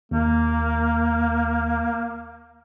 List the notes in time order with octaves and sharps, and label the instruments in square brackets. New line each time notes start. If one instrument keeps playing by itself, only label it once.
[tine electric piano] D#2 [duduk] A#3